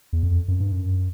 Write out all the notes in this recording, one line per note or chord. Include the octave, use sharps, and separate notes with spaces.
E2
F2
F#2
G2
F#2